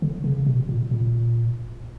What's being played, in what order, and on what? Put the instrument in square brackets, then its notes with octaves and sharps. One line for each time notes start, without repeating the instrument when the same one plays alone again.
[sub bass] D3
C#3
B2
A#2
A#2